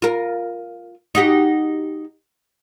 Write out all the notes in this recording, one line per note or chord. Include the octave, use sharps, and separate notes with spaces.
F4 A#4
D#4 F#4 G4